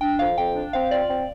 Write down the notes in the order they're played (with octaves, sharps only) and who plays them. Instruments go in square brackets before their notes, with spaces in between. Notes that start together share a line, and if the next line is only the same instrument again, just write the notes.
[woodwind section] D4 [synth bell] G5
[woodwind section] F2 [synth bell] F5
[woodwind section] F2 [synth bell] G5
[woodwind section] D4
[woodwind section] C4 [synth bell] F5
[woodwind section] F4 [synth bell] D5
[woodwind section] C4